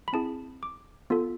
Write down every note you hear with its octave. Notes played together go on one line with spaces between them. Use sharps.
B5
C4 E4 G#4 A5
D6
B3 F4 A4